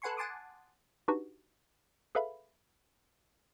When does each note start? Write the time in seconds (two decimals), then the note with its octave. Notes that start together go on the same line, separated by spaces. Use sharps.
0.02 A4 B4 F#5 G#5 C6 C#6
0.17 F#5 G#5 A5 C6 D6 D#6
1.08 D4 D#4 F#4 G4 B4
2.15 G#4 A4 B4 E5 F5 B5